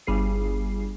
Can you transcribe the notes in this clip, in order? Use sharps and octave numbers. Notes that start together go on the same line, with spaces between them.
G1 G3 G#4 C7